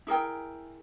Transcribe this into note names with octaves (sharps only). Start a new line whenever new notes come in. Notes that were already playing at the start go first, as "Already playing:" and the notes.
E4 G#4 A#4 G5